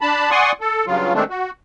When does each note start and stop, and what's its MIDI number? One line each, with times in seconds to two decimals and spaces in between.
0.01 0.31 62
0.01 0.31 81
0.01 0.31 83
0.31 0.52 74
0.31 0.52 78
0.31 0.52 80
0.31 0.52 84
0.31 0.52 85
0.31 0.52 87
0.61 0.85 69
0.87 1.13 43
0.87 1.13 49
0.87 1.13 54
0.87 1.13 65
1.14 1.24 51
1.14 1.24 56
1.14 1.24 57
1.14 1.24 60
1.14 1.24 62
1.30 1.51 66